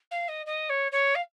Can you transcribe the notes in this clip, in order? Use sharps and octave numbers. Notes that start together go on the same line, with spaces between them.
F5
D#5
D#5
C#5
C#5
F5